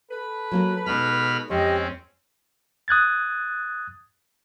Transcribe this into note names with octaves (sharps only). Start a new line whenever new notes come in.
A4 B4
F#3 A#3 A#4
B2 G#3 D#4 B5 F6
F2 G#3 C4 C#4 G4 D#5
D#6 F#6 G#6 A6